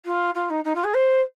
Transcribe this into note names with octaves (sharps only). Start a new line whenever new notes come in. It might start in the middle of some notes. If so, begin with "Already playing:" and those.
F4
F4
D#4
D#4
F4
G#4
C5